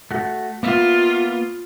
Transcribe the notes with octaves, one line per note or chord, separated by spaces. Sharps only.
A3 F#4
A#3 B3 F4 E5